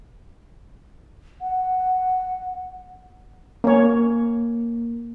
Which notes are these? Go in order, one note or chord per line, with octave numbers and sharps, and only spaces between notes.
F#5
A#3 C#4 C#5